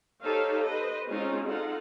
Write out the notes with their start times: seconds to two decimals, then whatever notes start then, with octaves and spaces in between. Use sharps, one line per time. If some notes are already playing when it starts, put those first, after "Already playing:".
0.22 D#4 G4 A4 C5 C#5 F5
0.62 B4 C5 D#5
1.07 G#3 C4 C#4 D#4 F4
1.47 D#4 F4 A4 F#5